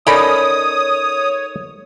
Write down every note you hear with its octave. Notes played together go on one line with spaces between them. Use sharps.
C#4 D#4 A4 A#4 C#5 D5 B5 D#6